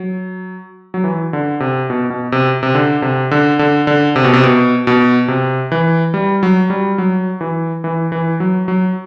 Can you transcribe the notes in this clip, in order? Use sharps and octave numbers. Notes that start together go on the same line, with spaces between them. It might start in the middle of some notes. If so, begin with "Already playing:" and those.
Already playing: F#3
F#3
E3
D3
C3
B2
B2
C3
C3
D3
C3
D3
D3
D3
C3
B2
C3
B2
B2
C3
E3
G3
F#3
G3
F#3
E3
E3
E3
F#3
F#3